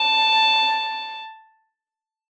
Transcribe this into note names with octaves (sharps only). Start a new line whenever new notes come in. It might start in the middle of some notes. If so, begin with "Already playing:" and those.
Already playing: A5